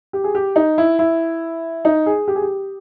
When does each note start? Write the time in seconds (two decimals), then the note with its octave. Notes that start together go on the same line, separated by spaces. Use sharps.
0.13 G4
0.24 G#4
0.35 G4
0.56 D#4
0.78 E4
0.99 E4
1.85 D#4
2.06 G#4
2.28 G4
2.36 G#4
2.42 G4